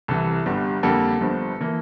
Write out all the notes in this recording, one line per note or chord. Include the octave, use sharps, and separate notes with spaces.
C2 C3 E3 A4
G1 G2 D3 G3
F2 D3 G3 A#3 A4
G1 G2 F3
E3 A#3